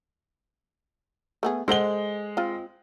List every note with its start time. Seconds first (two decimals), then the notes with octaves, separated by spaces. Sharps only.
1.43 A3 B3 G#4
1.68 G#3 A4 C5 F#5 G7
2.37 C4 F4